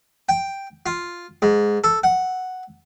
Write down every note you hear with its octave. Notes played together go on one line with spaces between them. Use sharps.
G5
F4
G#2
A4
F#5